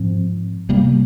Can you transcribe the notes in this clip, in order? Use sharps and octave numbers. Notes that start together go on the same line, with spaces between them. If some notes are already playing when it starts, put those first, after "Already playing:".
Already playing: G#2 F3 C4
C3 G3 A#3